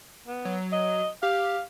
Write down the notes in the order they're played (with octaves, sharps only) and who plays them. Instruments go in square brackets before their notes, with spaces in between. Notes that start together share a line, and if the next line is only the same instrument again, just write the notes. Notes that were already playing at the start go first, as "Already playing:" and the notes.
[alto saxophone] B3
[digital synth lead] F#3
[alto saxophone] D#5
[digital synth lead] G4 [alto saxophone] F5